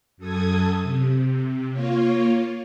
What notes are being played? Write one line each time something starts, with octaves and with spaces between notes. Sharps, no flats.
F#2 A4 D#6 G#6
C3
A#3 F4 C#5